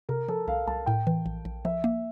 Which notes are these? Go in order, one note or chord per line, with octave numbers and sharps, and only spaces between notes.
C3 A#4
F3 A4
C2 F5
C2 A5
A2 G5
E3
A#1
A#1
F3 E5
A#3